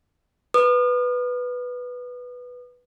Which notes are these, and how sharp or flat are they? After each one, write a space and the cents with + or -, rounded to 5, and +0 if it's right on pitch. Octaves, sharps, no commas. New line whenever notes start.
B4 +0 D#6 -40